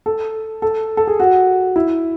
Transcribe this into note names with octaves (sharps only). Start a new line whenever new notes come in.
A4
A4
A4
G#4
F#4
E4